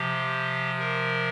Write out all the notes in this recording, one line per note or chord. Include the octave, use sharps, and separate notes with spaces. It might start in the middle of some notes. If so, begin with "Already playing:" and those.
Already playing: C3 F3 G4
A#4